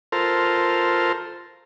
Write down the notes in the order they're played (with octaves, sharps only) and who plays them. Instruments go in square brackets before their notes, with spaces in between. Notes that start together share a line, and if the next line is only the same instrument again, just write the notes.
[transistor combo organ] F4 A4 A#4 C5